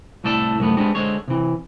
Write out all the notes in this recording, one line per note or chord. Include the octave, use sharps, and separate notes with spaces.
C2 A2 A3 A4 D5 A5
C2 F#2 A3 B3
G#3 B3 C4 D4 G4
D3 G#3 C5 C#5
C3 E3